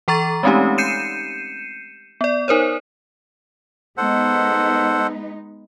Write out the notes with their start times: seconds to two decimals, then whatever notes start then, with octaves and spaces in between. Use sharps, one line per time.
0.08 E3 A4 A#5 C#6 A6
0.43 G#3 A3 C4 C#4 D#4 G4
0.78 G6 C7 C#7 D#7 E7
2.21 B3 D5
2.48 D#4 A#4 C5 C#5
3.97 G#3 B3 D#4 A4 C5 F#5